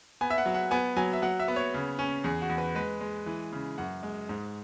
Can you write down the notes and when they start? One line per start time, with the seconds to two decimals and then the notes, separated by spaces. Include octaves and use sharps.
0.21 B3 G#5
0.30 E5
0.38 F#5
0.46 F#3
0.54 F#5
0.71 B3 G#5
0.96 F#3 G#5
1.13 E5
1.22 F#3 F#5
1.40 E5
1.48 B3
1.56 C#5
1.74 C#3
1.99 C#4
2.24 E2 G#4
2.42 F#4
2.50 E2
2.58 B4
2.75 G#3 B4
3.01 G#3
3.26 E3
3.52 C#3
3.78 F#2 F#5
4.03 G#3
4.29 G#2